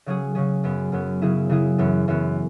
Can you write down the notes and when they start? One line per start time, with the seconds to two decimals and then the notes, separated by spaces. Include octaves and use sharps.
0.06 C#3 F#3 C#4 G#4
0.35 C#3 F#3 C#4 G#4
0.64 F#2 F#3 B3
0.92 F#2 F#3 B3
1.22 C#3 F#3 E4 G#4
1.49 C#3 F#3 E4 G#4
1.78 F#2 E3 B3 F#4
2.08 F#2 E3 B3 F#4